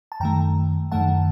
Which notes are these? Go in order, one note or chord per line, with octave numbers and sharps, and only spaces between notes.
A5
F#2 D#3 A3 G5 A#5
F#2 D#3 A3 F#5 A5